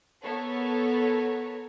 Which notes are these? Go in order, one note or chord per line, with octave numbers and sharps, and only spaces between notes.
B3 A4 A#4 C#5